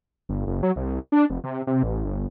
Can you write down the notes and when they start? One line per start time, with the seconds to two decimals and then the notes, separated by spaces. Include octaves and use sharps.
0.29 G1
0.47 F#1
0.63 F#3
0.76 C2
1.12 D4
1.30 F1
1.44 C3
1.67 C3
1.83 A1
2.04 G1